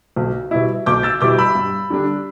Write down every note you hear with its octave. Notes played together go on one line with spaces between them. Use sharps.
B1
B2 G3 E4
B1 D6 G6
E6 A6
B2 G3 E4 D6 G6
B5 E6
G2
D3 G3 D4